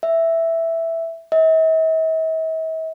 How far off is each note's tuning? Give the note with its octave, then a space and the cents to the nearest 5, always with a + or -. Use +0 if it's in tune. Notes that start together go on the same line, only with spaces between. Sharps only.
E5 +0
E5 -45